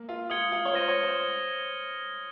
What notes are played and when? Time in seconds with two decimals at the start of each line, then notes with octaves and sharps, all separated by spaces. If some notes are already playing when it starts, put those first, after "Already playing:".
Already playing: A#3
0.09 F4
0.30 F4 D#6 G#6 C#7 G7
0.52 F4
0.65 C#5
0.73 C5 F6 A#6 D#7 G7
0.88 C#5
1.03 C5